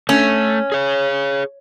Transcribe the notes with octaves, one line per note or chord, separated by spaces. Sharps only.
A3 C#4
G#4 C#5